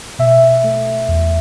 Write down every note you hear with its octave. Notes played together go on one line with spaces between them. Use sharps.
B2 E5
A3
E2